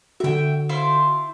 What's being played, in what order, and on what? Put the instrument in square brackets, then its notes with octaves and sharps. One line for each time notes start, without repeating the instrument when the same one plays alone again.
[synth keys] D3 F#4 [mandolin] E5 G5
[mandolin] E4 F4 C5